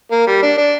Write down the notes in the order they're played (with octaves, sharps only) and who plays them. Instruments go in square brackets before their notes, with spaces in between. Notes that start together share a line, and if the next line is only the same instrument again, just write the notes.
[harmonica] A#3
G3
D4
D4